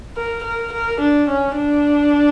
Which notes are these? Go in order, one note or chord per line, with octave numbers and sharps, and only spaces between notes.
A#4
A#4
A#4
D4
C#4
D4